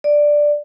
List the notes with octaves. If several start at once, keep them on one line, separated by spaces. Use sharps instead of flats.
D5